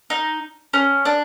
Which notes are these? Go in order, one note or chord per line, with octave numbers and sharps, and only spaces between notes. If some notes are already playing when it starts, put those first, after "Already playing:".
D#4
C#4
D4